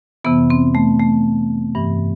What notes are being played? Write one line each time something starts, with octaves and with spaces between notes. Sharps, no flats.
F2 C3 E3 B3
C4
A3
A3
G2 E3